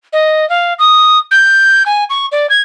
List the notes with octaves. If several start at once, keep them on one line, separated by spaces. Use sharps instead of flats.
D#5
F5
D#6
G6
G#5
C#6
D5
G#6